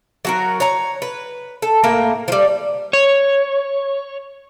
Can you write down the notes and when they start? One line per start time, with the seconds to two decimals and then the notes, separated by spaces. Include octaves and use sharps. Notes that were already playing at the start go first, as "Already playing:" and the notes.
0.25 F#3 F#4 A#4
0.60 C#5 A#5
1.02 B4
1.62 A4
1.84 A2 A#3 A#4 G5
2.28 F3 G3
2.93 C#5